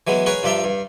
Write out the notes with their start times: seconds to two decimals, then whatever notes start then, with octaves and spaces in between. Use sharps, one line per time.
0.07 E3 F#3 G#3 B3
0.26 G#4 A#4 B4 C#5 F#5
0.43 G2 F3 D4 E5 G5 A#5
0.64 G2